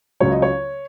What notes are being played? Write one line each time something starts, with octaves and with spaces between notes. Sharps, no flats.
C#2 C#3 F#3 C#5
D#5
C#5